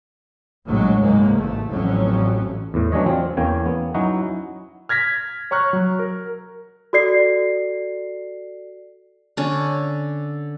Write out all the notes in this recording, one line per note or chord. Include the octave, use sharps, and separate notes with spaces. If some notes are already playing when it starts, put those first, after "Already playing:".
A#1 A2 F#3 G#3
F#1 C#2 G#2 G#3 A#3
A1 A3
A1 F2 F#3 C#4
E2 A2
E3 F#3 C#4 D4 C#5 D#5
C4 F4
E2 A#3 C#4 G5 G#5
B3
F#3 C#4 D#4 E4 F#4
F6 G#6 A#6 B6
C#5 A#5 C#6 F6 F#6
F#3
A#4
F#4 A4 D5 C7
D3 C#4